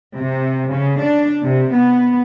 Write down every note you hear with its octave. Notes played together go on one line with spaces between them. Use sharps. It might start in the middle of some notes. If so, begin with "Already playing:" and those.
C3
C#3
D4
C3
B3